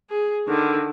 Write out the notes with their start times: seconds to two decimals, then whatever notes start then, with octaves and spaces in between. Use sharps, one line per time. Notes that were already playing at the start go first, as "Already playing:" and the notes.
0.10 G#4
0.48 D3 D#3